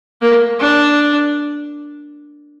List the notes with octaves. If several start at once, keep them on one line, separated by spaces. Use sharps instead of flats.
A#3
D4